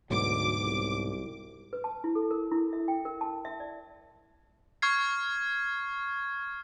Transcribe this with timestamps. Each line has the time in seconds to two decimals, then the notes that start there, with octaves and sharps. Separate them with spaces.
0.10 D2 G#2 B2 F#3 D6
0.64 C2
1.73 B4
1.84 A5
2.04 E4
2.15 A4
2.31 A#4
2.51 E4
2.73 E5
2.88 G5
3.05 A#4
3.21 A5
3.45 E5
3.60 D5
4.82 C#6 F6 G#6 C7